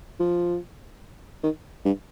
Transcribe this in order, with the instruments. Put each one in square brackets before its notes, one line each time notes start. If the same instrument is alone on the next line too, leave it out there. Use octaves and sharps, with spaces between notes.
[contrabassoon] F3
D#3
G2